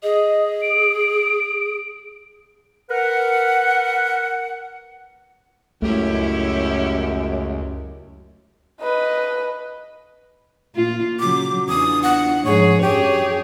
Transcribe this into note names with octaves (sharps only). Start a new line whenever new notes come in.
G#4 D#5
D7
A#4 B4 F#5
C#2 F#2 A3 C#4 E4 G4
B4 D#5
A#2 F4
C#3 F#3 D6
E2 D4 F4 D#6
F#5
G#2 F3 G#4 C#5
F#2 G4 G#4 C#5